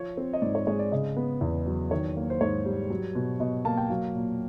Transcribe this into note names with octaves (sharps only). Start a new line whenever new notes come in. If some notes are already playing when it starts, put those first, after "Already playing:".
Already playing: F3 C#5
C4
D#5
G#2 D5
C#5
G#3 C#5
D5
C#3 D#5
B3
E2
F#3
D#3 C#5
A#3
C5
G#2 C#5
G3
F#3
B2
B2 D#5
A#3 A5
G5
F#3 F5
A#2